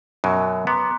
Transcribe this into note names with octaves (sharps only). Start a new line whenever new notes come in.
F#2 B2 F#3
B3 A#5 C6 D6